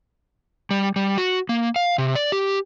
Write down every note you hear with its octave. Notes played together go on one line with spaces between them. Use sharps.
G3
G3
F#4
A#3
F5
C3
D5
G4